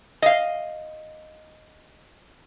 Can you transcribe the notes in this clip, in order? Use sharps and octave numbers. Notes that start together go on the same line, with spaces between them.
D#5 F5